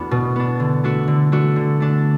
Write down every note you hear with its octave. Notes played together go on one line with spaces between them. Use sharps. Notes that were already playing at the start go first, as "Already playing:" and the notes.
Already playing: E2 A3 B3 D4 F#4
B2
B3 D4
D3
A3 D4 F#4
D3
A3 D4 F#4
D3
A3 D4